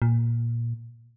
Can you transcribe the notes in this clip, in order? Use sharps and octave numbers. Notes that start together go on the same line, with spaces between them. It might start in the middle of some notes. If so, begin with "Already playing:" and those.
A#2